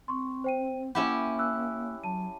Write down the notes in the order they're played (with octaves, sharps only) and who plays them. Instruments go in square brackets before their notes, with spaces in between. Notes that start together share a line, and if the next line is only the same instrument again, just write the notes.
[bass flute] C4 [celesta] C6 C#6
[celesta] C5 G5 D#7
[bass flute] A#3 [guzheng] C#4 E4 G4 [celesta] F#5 B5
[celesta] E6 F#6
[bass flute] F#3 [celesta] A5 D#7